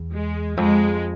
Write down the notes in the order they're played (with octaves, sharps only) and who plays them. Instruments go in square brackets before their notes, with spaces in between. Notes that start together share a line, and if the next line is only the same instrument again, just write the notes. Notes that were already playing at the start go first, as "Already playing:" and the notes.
Already playing: [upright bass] E2
[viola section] G#3
[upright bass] F2 [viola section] G#3